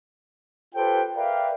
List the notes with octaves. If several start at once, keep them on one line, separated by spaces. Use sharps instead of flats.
F4 G4 A4 B4 C5 G5
A#4 B4 D5 E5 F5 G5